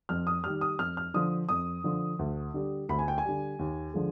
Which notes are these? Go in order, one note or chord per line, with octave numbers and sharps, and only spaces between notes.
F2 F6
D#6
D#3 G3 F6
D#6
F2 F6
F6
D3 F3 D#6
F2 D#6
D3 F3
D2
D3 G3
D2 B5
G#5
G5
G#5
D3 G3
D#2
D3 F3 G#3